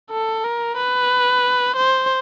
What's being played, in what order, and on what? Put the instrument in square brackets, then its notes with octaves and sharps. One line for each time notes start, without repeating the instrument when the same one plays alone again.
[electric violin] A4
A#4
B4
C5